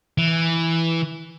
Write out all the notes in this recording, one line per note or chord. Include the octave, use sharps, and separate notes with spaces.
E3